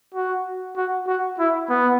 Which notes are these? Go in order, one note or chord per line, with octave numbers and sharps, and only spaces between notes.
F#4
F#4
F#4
E4
B3